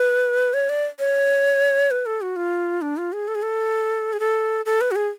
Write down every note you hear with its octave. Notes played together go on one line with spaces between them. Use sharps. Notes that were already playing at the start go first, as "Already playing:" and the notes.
Already playing: B4
C#5
D5
C#5
B4
A4
F#4
F4
D4
F4
G#4
A4
G#4
A4
G#4
A4
A4
B4
F#4
G#4